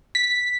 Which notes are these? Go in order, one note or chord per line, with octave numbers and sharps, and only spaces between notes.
B6